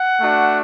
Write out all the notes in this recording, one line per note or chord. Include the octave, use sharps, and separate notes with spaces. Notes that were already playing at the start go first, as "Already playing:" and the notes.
Already playing: F#5
A3 D4 F#4